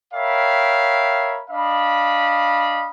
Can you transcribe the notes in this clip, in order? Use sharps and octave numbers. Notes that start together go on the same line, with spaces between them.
A#4 C#5 E5 F5 G5 B5
D4 D#5 F5 B5